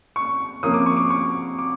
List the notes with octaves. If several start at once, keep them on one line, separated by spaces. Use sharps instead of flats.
C#6
C3 F3 A#3 C#4 D#6
D6
C#6
D6
C#6
D6